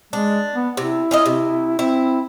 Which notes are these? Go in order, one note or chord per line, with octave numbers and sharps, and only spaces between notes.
G#3 D4
B3
C3 E4
C#4 F4 D#5
C3
C4 E4